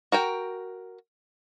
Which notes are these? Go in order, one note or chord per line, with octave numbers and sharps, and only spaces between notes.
F#4 A#4 G5